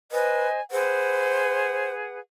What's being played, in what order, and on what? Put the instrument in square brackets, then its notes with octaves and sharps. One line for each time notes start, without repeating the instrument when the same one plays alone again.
[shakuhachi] B4 [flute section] C5 D#5 G#5
[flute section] G#4 B4 F#5 [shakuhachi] C5